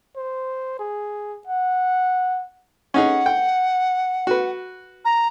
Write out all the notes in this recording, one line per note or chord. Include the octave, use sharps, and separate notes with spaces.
C5
G#4
F#5
C#4 D#4 G#4 F#5
G5
F#4 B4
A#5